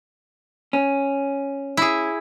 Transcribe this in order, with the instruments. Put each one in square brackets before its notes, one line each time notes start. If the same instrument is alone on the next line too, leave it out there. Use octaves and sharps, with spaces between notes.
[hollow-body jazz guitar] C#4
[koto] E4 G#4